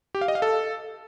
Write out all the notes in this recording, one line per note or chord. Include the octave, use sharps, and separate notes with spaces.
G4
F5
D#5
F5
A4